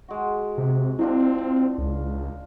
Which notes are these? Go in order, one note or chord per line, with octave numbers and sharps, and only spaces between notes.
G#3 F#4
C3
C4 D4 E4 F4 D#5
C#2